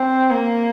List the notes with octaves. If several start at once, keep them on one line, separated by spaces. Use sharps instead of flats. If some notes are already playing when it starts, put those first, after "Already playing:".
Already playing: C4
A#3